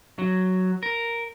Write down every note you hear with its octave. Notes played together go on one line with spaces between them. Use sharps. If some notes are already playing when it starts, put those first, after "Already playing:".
F#3
A#4